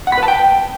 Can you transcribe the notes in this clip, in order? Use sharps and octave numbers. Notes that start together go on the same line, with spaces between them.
F#5
B5
B4
A5
G5